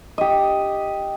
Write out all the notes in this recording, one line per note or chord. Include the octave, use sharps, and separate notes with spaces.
G4 D#5